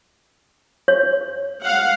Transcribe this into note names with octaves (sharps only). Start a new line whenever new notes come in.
C#5
F5 F#5